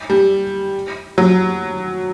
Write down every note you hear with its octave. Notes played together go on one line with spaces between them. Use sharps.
G3
F#3